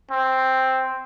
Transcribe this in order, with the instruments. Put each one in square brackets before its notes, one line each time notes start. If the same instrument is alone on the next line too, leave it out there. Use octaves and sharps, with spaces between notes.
[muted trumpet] C4